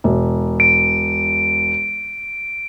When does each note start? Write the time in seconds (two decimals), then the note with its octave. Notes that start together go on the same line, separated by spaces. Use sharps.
0.04 E1
0.60 D7